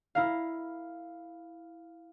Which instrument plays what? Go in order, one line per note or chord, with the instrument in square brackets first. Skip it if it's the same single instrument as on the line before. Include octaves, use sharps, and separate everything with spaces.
[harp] E4 A#4 F5